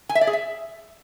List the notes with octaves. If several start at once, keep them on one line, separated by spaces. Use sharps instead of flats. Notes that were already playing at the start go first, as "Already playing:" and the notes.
G#5
E5
D5
G#4
E5